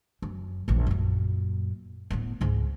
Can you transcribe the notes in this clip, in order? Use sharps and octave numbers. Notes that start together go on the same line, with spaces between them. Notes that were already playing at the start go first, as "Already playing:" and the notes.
F#2
A#1 E2
F#2 A#2
A2 B3
C#2 G#2